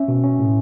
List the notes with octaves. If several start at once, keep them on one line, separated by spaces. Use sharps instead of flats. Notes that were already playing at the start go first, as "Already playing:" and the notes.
Already playing: C#4 E5
B2
C#4
A2